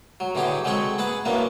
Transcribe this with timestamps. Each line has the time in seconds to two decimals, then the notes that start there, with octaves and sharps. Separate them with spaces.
0.20 F#3
0.35 D3 E3 F#3 G4 G#4
0.65 F#3 G#3 C4 A4 C#5 C#6
0.98 G#4 B4 F#5 A5
1.25 E3 F#3 A#3 B3 D4